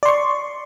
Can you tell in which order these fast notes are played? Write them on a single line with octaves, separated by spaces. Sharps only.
D5 C6 C#6